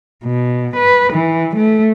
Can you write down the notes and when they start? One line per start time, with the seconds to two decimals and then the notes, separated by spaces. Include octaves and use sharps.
0.25 B2
0.76 B4
1.13 E3
1.56 A3